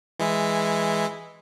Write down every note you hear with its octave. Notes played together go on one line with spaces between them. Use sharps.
E3 G#3 E4